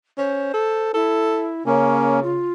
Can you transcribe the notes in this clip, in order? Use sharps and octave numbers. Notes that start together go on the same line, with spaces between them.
C#4 C5
A4
E4 A4
C#3 A#3 C#4 A#4
F4